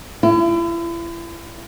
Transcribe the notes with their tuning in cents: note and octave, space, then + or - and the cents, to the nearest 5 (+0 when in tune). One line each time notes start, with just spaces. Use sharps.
E4 +40